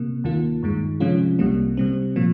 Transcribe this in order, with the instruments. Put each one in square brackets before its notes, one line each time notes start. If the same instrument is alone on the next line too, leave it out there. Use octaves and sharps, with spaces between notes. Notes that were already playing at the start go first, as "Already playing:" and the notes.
Already playing: [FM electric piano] C3 A#3
D#2 D#3 A#3 F4
G2 D#3 G#3
C3 F3 G#3 C#4 F4
C2 C3 G3 A#3
C3 G3 C4
A#2 F3 A#3